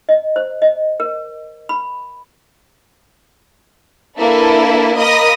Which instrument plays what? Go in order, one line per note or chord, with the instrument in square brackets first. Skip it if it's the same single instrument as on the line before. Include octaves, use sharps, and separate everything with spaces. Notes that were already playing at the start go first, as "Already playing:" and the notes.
[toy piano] D#5
C5
D#5
A#4
B5
[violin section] A#3 D4 E4 A4 B4
A#3 A#4 D#5 B5 D#6 A#6